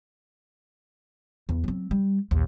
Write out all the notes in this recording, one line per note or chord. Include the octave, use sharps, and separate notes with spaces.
E2
F#3 C4
G3
A#1 D#2